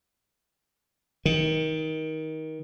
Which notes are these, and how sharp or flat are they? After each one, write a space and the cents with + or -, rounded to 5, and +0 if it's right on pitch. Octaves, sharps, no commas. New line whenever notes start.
D#3 +20